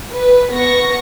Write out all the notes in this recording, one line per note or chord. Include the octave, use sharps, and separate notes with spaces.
B4
B3 C#6 A#6